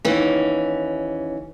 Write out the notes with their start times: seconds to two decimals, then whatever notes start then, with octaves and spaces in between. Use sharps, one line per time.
0.05 D#2 E3 C#4